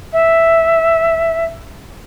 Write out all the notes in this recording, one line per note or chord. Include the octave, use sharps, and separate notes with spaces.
E5